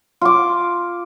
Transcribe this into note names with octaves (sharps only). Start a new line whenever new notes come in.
F4 D6